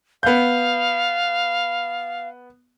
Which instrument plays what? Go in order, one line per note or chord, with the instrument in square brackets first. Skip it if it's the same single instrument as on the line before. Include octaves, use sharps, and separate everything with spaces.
[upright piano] B3 G6 [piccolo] F5